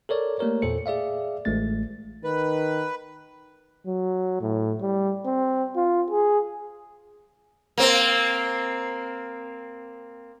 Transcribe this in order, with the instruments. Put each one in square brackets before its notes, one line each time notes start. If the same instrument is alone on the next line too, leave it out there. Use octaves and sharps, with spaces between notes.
[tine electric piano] A4 A#4 C#5 D5
A3 A#3 G4 A#4 C#5
E2 A#2 A4 C5 C#7
G#4 D5 E5 F5
A1 G#3 A3 A6
[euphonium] D#3 [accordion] B4
[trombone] F#3
A2
G3
C4
F4
G#4
[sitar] A#3 C4